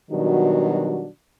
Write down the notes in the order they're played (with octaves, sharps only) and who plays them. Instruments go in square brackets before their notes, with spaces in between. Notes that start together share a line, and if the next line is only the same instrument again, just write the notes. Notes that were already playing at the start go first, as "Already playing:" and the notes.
[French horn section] B2 D#3 F#3 G3 D4 F#4